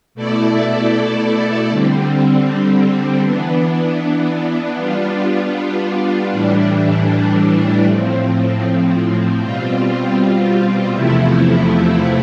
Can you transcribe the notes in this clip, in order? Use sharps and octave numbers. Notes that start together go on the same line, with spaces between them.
B2 A3 E4 A4 D5
D3 G3 C4
E3 B3 D4
G3 B3 D4 F4
A2 E3 G3 D4
A2 F3 C4
B2 G3 C4 F4
E2 C3 F3 A3 E4